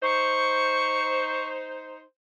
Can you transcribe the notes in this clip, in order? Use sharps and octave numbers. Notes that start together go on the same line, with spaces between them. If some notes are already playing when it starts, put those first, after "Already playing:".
D#4 C5 C#6